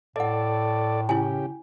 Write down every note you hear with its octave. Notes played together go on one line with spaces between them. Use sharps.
A2 A4 D5 D#5 F#5
C#3 E4 G4 G#5